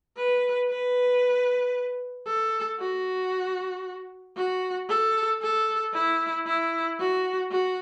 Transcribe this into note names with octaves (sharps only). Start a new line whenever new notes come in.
B4
B4
A4
F#4
F#4
A4
A4
E4
E4
F#4
F#4